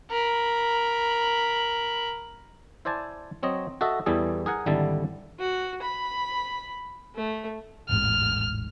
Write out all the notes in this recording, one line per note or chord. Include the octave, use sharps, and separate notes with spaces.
A#4 B5
E4 C5 D5 G#5 A5
F#3 C4 C#5 D#5
F#4 A4 D#5 E5
E2 E3 G3 G#4 A4
G#4 A#4 F#5 G#5
G#1 D3 G3 E4 A5
F#4
B5
A3
E1 A1 G#2 F6